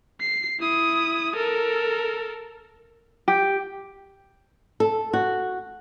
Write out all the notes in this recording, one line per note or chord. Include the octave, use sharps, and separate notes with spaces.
C7
E4 D#6
A4 A#4
G4
A4
F#4